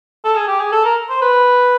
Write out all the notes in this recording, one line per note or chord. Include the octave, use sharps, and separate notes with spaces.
A4
G#4
G4
G#4
A4
A#4
C5
B4